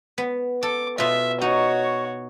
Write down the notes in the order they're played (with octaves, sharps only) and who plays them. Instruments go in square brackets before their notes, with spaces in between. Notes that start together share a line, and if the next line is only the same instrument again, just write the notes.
[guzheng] B3
[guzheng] A4 [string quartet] D6
[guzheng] B2 F4 [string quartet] E5
[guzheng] D#4 [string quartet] F#4 C#5